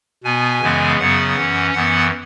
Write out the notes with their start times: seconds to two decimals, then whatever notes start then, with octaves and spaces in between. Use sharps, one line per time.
0.24 B2 B3 G#5
0.61 F#2 C#3 E3 G#3 B3
0.99 F#2 C#3 F#3 B3 F#5
1.37 F#2 E3 C#4
1.73 F#2 E3 B3 F#5